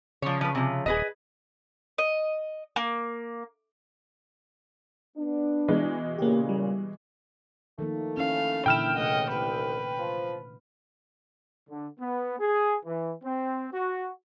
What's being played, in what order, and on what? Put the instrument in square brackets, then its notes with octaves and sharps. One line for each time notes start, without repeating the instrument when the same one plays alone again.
[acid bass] C#3 [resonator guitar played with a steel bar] F3 C#5
[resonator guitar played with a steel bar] F3 B4
C3 F3
[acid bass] D#1 [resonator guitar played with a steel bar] G#4 B4 D#5
[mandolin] D#5
A#3
[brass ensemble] B3 D4
[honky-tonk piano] B2 E3 G#3
[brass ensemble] A#2 C#3 [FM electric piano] A#3 G4
[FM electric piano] G3
[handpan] D#3 F3 A#3 [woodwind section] A3
[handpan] C#4 E4 [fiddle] F5
[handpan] A#2 D3 E3 [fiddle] E4 [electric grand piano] G5 F6 E7
[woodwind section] C#2 A2 [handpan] C3 A3 F#5 [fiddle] D#5
[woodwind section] C2 [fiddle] B4
[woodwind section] F3
[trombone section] D3
B3
G#4
E3
C4
F#4